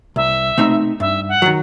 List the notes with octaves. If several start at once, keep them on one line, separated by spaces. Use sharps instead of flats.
C2 E5
B2 A3 C4 D#4
G2 E5
F#5
D#3 F#3